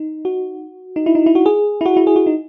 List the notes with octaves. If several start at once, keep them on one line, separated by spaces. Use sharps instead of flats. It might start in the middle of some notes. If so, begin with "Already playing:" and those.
Already playing: D#4
F#4
D#4
E4
D#4
E4
F#4
G#4
E4
F#4
E4
G#4
F#4
D#4